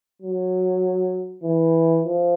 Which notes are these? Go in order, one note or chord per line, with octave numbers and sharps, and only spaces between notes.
F#3
E3
F3